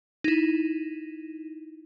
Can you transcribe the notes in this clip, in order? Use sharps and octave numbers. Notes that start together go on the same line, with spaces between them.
D#4 E4